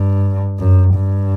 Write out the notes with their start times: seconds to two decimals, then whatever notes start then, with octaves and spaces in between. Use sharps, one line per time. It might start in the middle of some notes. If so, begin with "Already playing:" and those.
Already playing: G2
0.59 F#2
0.95 G2